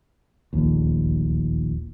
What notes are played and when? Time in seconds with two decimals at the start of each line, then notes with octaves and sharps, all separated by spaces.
0.53 D1 A#1 D#2